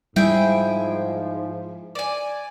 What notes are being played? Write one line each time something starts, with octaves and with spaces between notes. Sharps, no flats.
G#2 F3 G3 E4 G#4 G5
D5 G#5